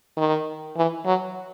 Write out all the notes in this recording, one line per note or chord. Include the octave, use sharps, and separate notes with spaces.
D#3
E3
F#3